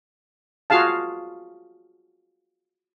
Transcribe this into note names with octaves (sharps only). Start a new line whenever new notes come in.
F4 F#4 G#4 F5 A5